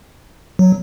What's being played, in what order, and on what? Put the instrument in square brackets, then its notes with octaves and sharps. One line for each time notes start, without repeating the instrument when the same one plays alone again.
[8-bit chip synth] F#3